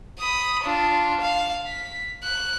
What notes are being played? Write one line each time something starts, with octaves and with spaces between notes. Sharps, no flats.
B5 D#6
D4 F4
F5
B6
F#6